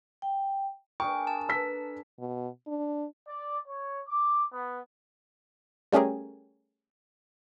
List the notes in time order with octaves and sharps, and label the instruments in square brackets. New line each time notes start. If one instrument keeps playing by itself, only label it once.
[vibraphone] G5
[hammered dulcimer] D4 G#4 A#4 [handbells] G5 [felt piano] C#6
[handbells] A5
[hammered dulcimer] A4 B4 [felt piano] E6 B6
[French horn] B2
D4
[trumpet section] D5
C#5
D6
B3
[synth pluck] G3 A3 C#4 G4 G#4 A#4